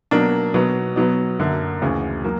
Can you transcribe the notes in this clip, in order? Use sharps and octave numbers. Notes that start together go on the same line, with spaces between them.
B2 F#3 A#3 D4
B2 F#3 B3
B2 F#3 B3
F#2 D3 A#3
D2 C#3 E3
F#3 A#3